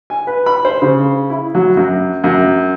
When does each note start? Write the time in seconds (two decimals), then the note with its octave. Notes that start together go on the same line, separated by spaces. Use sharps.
0.10 G#5
0.27 B4
0.46 B5
0.65 C5
0.82 C#3
1.30 E4
1.55 F#3
1.77 F#2
2.24 F#2